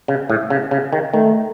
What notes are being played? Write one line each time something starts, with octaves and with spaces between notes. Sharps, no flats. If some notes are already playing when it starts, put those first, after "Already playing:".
C#3
A2
C#3
C#3
D#3
D#3 A3